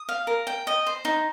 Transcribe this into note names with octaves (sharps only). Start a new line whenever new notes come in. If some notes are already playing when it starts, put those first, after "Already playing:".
Already playing: D#6
F5
A#4
G5
D#5
C5
D#4